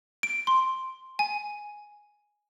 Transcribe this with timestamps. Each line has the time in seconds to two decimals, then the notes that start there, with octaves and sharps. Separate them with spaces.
0.23 D7
0.47 C6
1.19 G#5